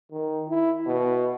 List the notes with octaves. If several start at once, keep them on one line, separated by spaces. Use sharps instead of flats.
D#3
E4
B2